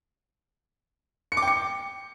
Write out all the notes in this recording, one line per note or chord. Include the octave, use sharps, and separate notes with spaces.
C#7
D6
G5
C#7